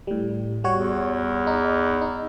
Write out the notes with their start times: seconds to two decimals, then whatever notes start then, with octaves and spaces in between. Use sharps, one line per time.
0.07 A2 G3
0.64 G3 F#4 C#5
0.76 E2
1.47 D#4
2.01 D#4